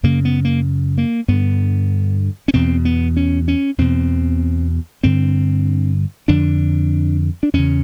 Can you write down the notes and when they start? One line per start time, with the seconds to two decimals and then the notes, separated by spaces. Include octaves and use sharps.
0.03 F#2 C#3 A#3
0.25 B3
0.45 A#3
0.98 A#3
1.28 G2 D3 B3
2.48 C#4
2.53 E2 B2 C4
2.85 B3
3.17 C#4
3.48 C#4
3.78 E2 B2 C4
5.03 G2 D3 C4
6.28 F2 D3 D4
7.43 D4
7.53 E2 C#3 C#4